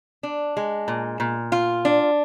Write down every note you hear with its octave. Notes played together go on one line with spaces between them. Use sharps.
D4
G#3
A#2
A#2
F4
D4